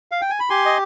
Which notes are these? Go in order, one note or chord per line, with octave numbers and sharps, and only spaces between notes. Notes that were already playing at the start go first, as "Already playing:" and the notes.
F5
G5
G#5
B5
G4 G#5 C6
D#5